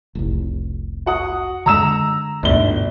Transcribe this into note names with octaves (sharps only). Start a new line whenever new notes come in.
F1 C2
F#4 F#5 D#6
D3 G#3 A#5 E6 E7
G1 D2 G#2 B2 D4 G7